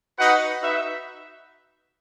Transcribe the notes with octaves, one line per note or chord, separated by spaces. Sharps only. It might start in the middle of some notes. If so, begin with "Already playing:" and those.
D#4 F#4 B4 D#5 F#5
D#4 F#4 B4 E5